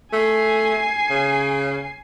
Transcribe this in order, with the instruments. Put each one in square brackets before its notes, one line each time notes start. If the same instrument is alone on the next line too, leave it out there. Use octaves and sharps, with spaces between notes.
[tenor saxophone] A3 [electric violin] G#5 C7
[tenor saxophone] C#3